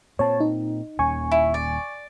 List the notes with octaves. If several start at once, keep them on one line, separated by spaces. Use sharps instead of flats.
A#2 C4 C#5 A5
D#4
D#1 D#2 C#4 G#5 C#6
E4
D5